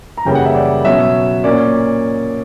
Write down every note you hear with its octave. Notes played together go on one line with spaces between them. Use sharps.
A#5
F#2 C#3 E3 G3 A#3 G5
F#5
E5
D5
B2 F#3 C#4 E5
A#2 A#3 C#4 D5